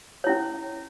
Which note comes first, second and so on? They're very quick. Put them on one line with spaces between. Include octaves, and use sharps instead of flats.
C#5 E4 C#4